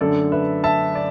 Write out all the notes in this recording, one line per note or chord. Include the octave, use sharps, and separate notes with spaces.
F#2 D3 A3 A4 D5
B4 E5
E5 A5
D5